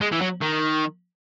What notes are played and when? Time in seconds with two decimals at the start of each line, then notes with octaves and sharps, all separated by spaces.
0.01 G#3
0.12 E3
0.21 F#3
0.41 D#3